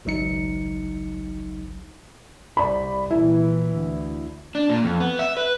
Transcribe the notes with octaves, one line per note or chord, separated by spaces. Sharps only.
G#1 C#2 F#3 D#4 C#7
C2 D5 B5
A#2 E3 E4
D2
D4
A#2
F2
B3
E5
B4